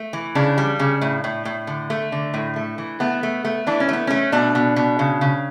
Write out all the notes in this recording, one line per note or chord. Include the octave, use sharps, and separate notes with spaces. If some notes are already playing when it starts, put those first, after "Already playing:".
Already playing: A3
E3
C#3 D4
G3
C#3
A2
A2
A2
D3
A3
D3
A2
A3
E3
A3 B3
A3
A3
E3 D4
C#4
A3 B3
A3 C#4
B2 D4
B2
B2
C#3
C#3